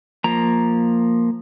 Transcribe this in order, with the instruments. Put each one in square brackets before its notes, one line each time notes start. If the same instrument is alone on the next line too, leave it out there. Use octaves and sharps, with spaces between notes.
[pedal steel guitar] F3 A#3 A#5